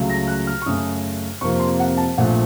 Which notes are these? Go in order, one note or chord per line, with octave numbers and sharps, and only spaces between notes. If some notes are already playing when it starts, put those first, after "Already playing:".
Already playing: C#2 C#3 F#3 A3
A#6
F#6
F6
C#6
F#2 C#3 A3 D#6
F2 C3 F3 A#3 C#6
C6
F#5
A5
A#1 A#2 F3 A3 F#5